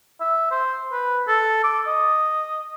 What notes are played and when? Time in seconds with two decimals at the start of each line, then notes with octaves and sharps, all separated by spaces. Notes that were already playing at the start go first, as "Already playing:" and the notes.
0.20 E5
0.51 C5
0.92 B4
1.28 A4
1.64 D6
1.87 D#5